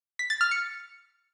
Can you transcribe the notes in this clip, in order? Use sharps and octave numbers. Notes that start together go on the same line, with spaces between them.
B6
A6
F6
C#7